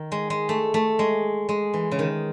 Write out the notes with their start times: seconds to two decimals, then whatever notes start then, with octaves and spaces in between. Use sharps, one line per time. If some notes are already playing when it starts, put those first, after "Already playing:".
Already playing: D#3
0.12 G#3
0.30 G#3
0.49 A3
0.74 A3
0.99 G#3
1.49 G#3
1.74 E3
1.91 C#3
1.99 D#3